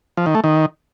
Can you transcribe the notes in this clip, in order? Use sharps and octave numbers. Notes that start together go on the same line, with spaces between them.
F3
D#3
A3
D#3